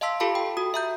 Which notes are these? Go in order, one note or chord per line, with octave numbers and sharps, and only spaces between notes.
D#5 F5 A5 C6 E6 B6
F4 G4 A4 F5 A5 B5
G5
F#4 D#6
E5 A#5 G6